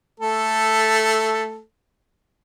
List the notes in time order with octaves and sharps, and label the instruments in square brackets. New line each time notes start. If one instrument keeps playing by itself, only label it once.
[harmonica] A3 A4